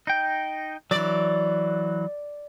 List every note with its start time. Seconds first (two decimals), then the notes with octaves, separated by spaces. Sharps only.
0.07 D#4 G5
0.91 E3 F#3 D5